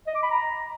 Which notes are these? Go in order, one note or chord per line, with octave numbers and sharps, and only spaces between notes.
D#5
D6
B5
A#5